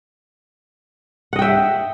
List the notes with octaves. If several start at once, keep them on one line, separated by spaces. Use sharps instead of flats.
D#5 E5 F#5 G5